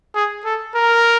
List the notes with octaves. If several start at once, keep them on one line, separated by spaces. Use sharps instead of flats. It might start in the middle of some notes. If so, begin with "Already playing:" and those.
G#4
A4
A#4